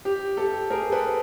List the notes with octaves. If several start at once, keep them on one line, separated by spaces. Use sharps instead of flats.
G4
G4 A4
G#4 A#4
A4 B4